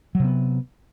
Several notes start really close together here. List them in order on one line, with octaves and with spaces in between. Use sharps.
F#3 C3 B3